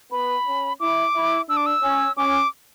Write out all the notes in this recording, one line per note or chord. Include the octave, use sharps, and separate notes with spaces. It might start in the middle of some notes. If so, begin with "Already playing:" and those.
B3 B5
C#4
E4 D6
E4
D4 E6
D6
E6
C#4
C#4 D6